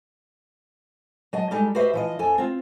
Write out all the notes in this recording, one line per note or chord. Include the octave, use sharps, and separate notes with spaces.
F#3 D#5 A5
G3 G#3 D#4 G4 A4
F#4 G4 B4 C5 D#5 E5
E3 F3 D#5
F2 A4 G#5
C4 F4